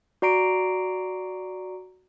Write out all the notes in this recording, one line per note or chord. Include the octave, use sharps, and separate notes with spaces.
F#4 D5 A#5 C7 D7